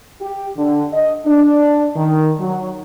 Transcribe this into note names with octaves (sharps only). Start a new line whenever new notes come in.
G4
D3
D#5
D4
D#3
F#3